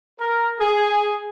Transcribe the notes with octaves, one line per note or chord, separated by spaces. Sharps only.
A#4
G#4